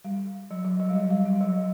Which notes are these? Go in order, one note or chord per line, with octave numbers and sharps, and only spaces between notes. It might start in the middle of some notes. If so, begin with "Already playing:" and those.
G3
F#3
F#3
F#3
G3
F#3
G3
G3
F#3
F#3